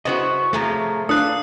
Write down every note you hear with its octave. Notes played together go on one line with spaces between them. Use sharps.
C#3 B3 E4 F#4 C5 D#5
A2 C3 F3 A3 G#4 A#5
D4 A4 B4 F5 D#6 F#6